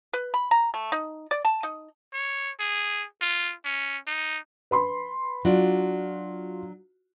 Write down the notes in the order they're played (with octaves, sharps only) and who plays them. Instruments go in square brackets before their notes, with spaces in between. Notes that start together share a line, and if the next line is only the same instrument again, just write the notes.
[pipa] B4
B5
A#5
A3
D#4
D5
A5
D#4
[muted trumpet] C#5
G#4
F4
C#4
D#4
[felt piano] B4 B5 C6
[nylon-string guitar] F#3 D4 [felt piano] F4 F#4